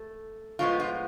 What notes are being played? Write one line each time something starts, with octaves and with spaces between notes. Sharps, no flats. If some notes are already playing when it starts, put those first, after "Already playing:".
Already playing: A3
A2 F3 G#3 B3 F4
F4